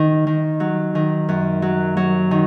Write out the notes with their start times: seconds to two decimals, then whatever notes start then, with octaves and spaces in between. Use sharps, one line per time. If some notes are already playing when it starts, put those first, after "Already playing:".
Already playing: D#3
0.27 D#3
0.60 F#3
0.95 D#3
1.29 F#2
1.62 F#3
1.97 F#3
2.31 D#3